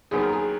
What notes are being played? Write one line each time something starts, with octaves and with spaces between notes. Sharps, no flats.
D#2 D#3 F#3 B3 G#4
A#4
G#4